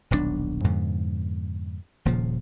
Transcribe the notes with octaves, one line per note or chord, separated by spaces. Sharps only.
D#1 B1 C3 D4
F2 G#2 B2 D3
D#1 A#2 C#3 F3